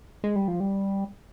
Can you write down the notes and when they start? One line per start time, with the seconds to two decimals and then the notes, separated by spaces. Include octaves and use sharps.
0.24 G#3
0.36 G3
0.48 F3
0.60 G3